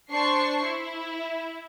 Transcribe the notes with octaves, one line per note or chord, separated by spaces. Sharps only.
D4 C5 C#6 C7
E4